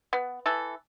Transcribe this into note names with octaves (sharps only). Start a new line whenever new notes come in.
B3
E3 A4